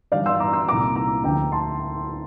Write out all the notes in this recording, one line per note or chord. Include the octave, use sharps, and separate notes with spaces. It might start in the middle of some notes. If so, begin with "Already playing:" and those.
G2 E3 G3 D5 F5
C6 E6
A#5 D6
C6 E6
C2 A#2 G3 A#5 D6
A#5 D6
D2 D3 F3 G5 A#5
A5 C6